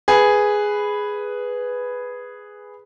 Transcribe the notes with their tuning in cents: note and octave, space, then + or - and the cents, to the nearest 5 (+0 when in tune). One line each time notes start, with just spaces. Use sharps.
G#4 +0 B4 +0